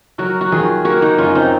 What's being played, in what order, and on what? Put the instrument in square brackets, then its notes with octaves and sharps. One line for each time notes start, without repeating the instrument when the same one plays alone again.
[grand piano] F#3 [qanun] F#4 A#4
[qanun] F#4
[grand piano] D#3 [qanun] F4 G#4
[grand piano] A#3 [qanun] F#4 A#4
[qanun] D#4 F#4
[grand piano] F#2 [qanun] C#4 F4
[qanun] C4 D#4